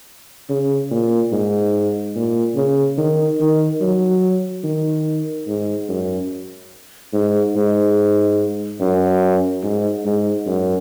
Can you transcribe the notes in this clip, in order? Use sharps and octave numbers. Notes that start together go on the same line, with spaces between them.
C#3
A#2
G#2
A#2
C#3
D#3
D#3
F#3
D#3
G#2
F#2
G#2
G#2
F#2
G#2
G#2
F#2